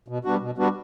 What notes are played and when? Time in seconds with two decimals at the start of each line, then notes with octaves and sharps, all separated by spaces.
0.08 B2
0.25 G3 B3 D4 F#4
0.41 B2
0.58 G3 B3 D4 F#4